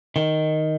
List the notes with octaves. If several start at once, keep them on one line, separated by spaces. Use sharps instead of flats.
D#3